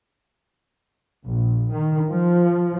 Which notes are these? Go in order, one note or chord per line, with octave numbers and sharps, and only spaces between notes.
A#1
D#3
F3